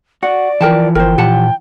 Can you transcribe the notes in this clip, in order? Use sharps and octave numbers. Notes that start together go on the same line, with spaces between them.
F#4 D5 F#5
E3 F3 A#4 G5 A5
G1 A#4 C5 G5
A#2 G4 F#5 A5